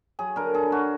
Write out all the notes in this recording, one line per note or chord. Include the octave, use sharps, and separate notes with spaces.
F#3 G#4
D3 A#4
D4 G#4
D4 F#4